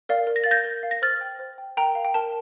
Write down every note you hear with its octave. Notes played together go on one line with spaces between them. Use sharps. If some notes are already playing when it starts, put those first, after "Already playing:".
A#4 D5 F5
A#4
A#6
F5 A6
G6 A#6
A#4
F5
A#6
C5 F6 A6
G5
C5
G5
A#4 G5 A#5
F5
G5
A#4 A5